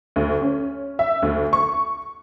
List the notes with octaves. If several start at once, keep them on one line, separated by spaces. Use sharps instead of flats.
D2
C#4
E5
D2
C#6